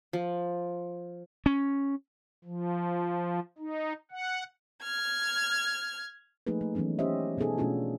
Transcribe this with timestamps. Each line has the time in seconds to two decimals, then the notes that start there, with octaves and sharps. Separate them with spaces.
0.13 F3
1.46 C#4
2.44 F3
3.58 D#4
4.11 F#5
4.83 F6 G#6
6.47 F3 A3 A#3 D#4 G#4 B4
6.61 A3
6.75 E3 F#3 B3 C#4 D#4
6.99 C#4 G4 C5 C#5 D#5 E5
7.37 B2 B3 D#4 G#4 A4
7.58 B2 A3 C#4 D4 F4 F#4